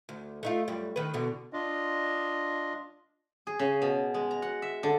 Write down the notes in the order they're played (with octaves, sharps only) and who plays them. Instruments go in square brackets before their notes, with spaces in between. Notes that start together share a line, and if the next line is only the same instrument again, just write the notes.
[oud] D2
A3 D#4 F4
F#2 G3
D#3 B4
E2 B2 D3
[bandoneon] D4 F4 D#5
[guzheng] G#4
C#3
B2
G#3
A#5
F#5
E5
D3